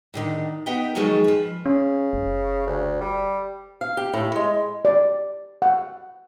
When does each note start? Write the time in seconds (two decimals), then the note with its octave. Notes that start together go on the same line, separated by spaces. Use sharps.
0.14 A2 D3 D#3
0.66 B3 D#4 E5 G5
0.95 D#3 F3 F#3 G#3 A3
1.24 F3 B4
1.66 C#3 C#4
2.13 F#1
2.66 D2
3.01 G3
3.81 F5
3.97 G4
4.14 A2
4.36 G#3
4.85 D5
5.62 F#5